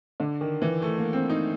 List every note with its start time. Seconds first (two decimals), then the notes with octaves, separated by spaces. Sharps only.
0.20 D3
0.41 D#3
0.62 E3
0.82 A3
0.98 A#3
1.13 C4
1.30 D#4